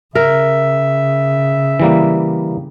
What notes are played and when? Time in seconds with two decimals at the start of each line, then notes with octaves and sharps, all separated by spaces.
0.15 C#3 A#4 E5
1.80 E3 G3 A#3